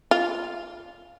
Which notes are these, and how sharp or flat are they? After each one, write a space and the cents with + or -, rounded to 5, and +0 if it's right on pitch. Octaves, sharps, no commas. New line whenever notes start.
F4 +0